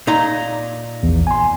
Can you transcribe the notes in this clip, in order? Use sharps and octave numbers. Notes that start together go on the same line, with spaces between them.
A#2 D#4 A#5
A#1 E2
G#5 C6